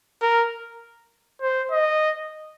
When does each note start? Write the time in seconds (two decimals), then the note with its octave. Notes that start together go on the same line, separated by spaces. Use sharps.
0.22 A#4
1.42 C5
1.71 D#5